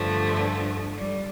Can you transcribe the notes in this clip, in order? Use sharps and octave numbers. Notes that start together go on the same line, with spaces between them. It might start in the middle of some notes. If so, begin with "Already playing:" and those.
Already playing: G2 D3 F3 A3
G3